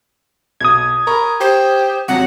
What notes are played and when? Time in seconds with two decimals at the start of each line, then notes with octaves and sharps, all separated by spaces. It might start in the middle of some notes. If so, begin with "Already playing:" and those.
0.61 B1 B2 D#6 G#6
1.07 A#4 A#5 B5 C#6
1.41 G4 C5
2.08 F2 C3 F#3 F#5